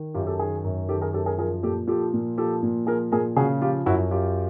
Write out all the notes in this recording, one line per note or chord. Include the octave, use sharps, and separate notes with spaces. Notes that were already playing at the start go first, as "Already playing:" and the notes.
Already playing: D#3
F#2 F4 G4
G4 A4
D#3 G#4 A#4
F#2
D#3 G4 A4
G#4 A#4
F#2 G4 A4
G#4 A#4
F3 G#4 A#4
A#2 G4 A4
F3 G4 A4
A#2
F3 G4 A4
A#2
F3 G#4 A#4
A#2 G#4 A#4
C#3 F#4 G#4
F3 F4 G4
F#2 E4 F#4
F#2 F4 G4